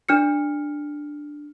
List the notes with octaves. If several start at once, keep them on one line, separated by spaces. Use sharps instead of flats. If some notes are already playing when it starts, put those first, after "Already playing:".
D4 F6 C#7